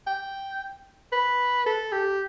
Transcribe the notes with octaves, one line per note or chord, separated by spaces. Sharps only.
G5
B4
A4
G4